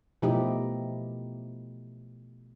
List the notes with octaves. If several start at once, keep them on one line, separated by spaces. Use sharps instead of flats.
B2 F3 A3 D#4 E4 G4